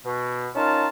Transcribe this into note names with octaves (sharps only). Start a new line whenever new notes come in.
B2
C#4 D#4 F4 A#4 A5